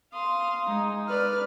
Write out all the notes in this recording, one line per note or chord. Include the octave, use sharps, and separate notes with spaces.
F5 C6 D#6
G#3 D#4
B4 D5 F6